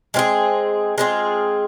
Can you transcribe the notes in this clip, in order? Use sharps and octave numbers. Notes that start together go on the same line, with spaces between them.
G#3 C4 F4 G#4
G#3 C4 F4 G#4